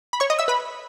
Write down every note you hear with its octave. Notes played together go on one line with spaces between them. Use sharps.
B5
C#5 C#6
D#5 D#6
E5 E6
B4 B5